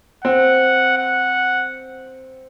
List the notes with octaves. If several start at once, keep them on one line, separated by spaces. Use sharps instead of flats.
C4 F#5
F#5